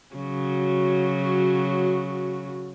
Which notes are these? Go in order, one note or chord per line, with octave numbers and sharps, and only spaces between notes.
C#3 F#3 F#4